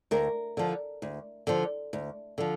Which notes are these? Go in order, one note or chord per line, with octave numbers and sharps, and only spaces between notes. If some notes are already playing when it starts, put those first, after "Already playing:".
D2 A#4
D3 F3
D2
D3 F3
D2
D3 F3